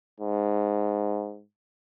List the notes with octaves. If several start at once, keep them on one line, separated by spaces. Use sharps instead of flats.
G#2